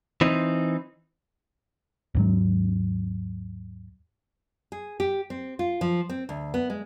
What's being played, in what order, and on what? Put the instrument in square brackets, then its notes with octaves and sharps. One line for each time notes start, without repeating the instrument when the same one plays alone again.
[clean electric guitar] E3 C4 D#4
[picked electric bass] D#2 G#2 F#3
[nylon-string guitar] G#4
G4
C4
F4
F3
C4
D2
B3
G#3